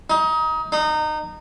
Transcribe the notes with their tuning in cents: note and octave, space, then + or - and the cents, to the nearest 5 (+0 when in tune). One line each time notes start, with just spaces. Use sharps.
D#4 +25
D#4 -25